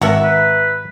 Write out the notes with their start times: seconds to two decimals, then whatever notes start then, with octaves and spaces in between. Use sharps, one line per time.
0.02 G#1 F#4 A#4 E5
0.24 B4